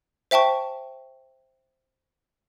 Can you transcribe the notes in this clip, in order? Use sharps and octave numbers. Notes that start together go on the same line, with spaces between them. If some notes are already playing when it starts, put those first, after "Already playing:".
C5 E5 G5 A5 C#6